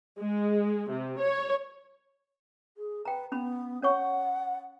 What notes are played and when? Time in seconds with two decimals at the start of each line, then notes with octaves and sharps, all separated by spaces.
0.21 G#3
0.91 C3
1.21 C#5
2.77 G#4
3.05 B4 G5 A#5
3.32 B3 C#4 B5
3.83 C#4 C#5 F#5 C#6